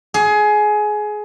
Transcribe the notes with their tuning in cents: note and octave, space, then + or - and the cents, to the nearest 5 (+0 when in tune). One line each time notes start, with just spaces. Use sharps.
G#4 +20